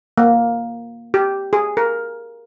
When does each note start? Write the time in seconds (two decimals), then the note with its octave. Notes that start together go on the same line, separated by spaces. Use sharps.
0.18 A#3
1.14 G4
1.53 G#4
1.77 A#4